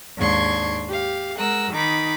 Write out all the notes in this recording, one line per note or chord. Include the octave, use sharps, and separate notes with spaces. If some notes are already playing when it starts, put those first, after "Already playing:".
D#2 G#2 D4 C6 C#6 G#6
G4 F5
G#3 A#4 F#5 E6
D#3 D#4 B5 D6